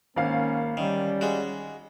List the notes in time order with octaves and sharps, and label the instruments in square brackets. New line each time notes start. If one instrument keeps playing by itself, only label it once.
[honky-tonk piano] G#1 F5 [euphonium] A#3 [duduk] C#4
[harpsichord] D#3 [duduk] G3 [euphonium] C#4
[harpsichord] G#3 F#4